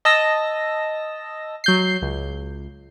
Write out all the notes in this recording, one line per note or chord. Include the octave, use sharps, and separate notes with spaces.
D#5 A5 E6 A#6
F#3 G6 C7
C#2